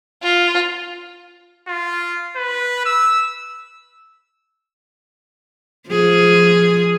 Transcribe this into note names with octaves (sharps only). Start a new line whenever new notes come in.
F4
F4
B4
E6
F3 G#4